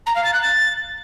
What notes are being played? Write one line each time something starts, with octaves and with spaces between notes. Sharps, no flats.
A#5
F5
A6
F#6
A6